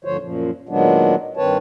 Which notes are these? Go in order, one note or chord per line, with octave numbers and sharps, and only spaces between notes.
D2 G2 D3 F3 C5 C#5
F#2 A#2 F3
A#2 D#3 F#3 G#3 B3 D4
G2 D#3 C4 B4 C#5 A5